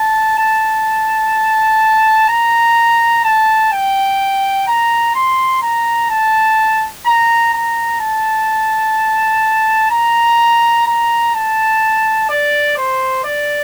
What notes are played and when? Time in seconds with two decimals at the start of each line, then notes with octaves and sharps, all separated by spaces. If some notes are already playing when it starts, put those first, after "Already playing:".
Already playing: A5
0.38 A5
2.29 A#5
3.24 A5
3.72 G5
4.67 A#5
5.15 C6
5.62 A#5
6.10 A5
7.06 A#5
7.53 A#5
8.00 A5
9.91 A#5
10.86 A#5
11.34 A5
12.29 D5
12.77 C5
13.24 D5